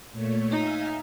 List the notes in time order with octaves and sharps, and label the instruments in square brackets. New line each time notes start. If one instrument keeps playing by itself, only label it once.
[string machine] A#2 A3 C#5
[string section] D#4 [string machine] E5 F5 G#5